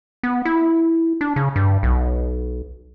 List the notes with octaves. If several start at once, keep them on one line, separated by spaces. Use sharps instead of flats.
B3
E4
D4
C#3
G2
B1